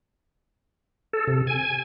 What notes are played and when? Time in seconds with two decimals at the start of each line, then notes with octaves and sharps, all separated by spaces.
1.13 A4
1.27 C3
1.47 G#5